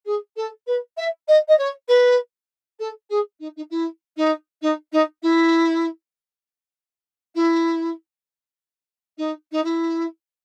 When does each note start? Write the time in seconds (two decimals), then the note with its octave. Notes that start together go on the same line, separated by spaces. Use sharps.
0.05 G#4
0.36 A4
0.66 B4
0.97 E5
1.27 D#5
1.48 D#5
1.58 C#5
1.88 B4
2.79 A4
3.09 G#4
3.39 D#4
3.56 D#4
3.70 E4
4.16 D#4
4.61 D#4
4.92 D#4
5.22 E4
7.34 E4
9.17 D#4
9.51 D#4
9.63 E4